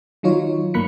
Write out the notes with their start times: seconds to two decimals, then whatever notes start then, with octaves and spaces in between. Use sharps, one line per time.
0.23 D#3 F#3 D#4 F4 C#5
0.74 G1 A#3 B5 F#6 B6 C#7